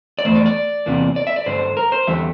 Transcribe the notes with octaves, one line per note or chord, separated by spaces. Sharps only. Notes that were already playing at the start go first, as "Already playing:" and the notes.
D5
E2 E3 A3 C5
D5
D5
E2 C3 E3 A#3
D5
E5
D5
G2 D3 G3 C5
A#4
C5
E2 D3 G3 E5